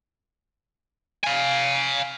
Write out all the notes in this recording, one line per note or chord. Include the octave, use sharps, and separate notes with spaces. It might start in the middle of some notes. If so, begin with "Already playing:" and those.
F5 G#5